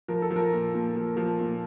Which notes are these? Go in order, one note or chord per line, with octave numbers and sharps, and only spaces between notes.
F3 A#4
A4
F3
A#4
A#2
A#2
F3
F3
A#2